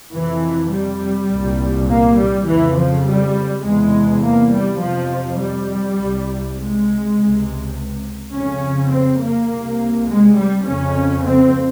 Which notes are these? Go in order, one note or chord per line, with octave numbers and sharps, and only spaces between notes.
F2 C3 E3
G3
C2 A#2
A#3
G3
F2 C#3 E3
F3
G3
E2 C3 G#3
A#3
G3
F2 C3 F3
G3
C2
C3
G#3
C#2 C3
F2 C#3 C#4
C4
A#3
C2 C3
G#3
G3
F2 C#3 C#4
C4